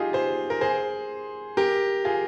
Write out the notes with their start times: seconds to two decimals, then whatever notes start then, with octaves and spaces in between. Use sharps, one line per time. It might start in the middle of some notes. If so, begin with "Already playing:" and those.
Already playing: D#4 F4 G4 G#4
0.13 G#4 C5
0.50 A#4
0.61 G#4 C5
1.57 G4 A#4
2.05 F4 G#4